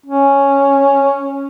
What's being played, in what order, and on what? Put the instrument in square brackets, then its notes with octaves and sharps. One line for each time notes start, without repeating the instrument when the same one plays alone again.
[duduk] C#4